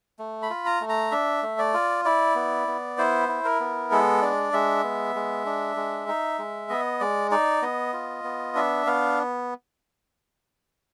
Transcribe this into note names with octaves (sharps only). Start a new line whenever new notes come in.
A3
B5
F4
A#5
A3
A#5
D4 E5
A3
D5
F4
E4 D5
B3
B3
E4 C5
E4
A#4
B3
G#3 A4
D4 D5
G#3 E5
B3
G#3
D4
G#3
D#4
G#3
B3 D#5
G#3 D5
D#4 D5
B3 D#5
F4
B3
D4 E5
B3 F5